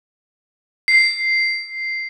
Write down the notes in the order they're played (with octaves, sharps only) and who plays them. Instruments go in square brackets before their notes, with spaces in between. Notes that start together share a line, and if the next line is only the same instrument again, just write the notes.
[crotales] C7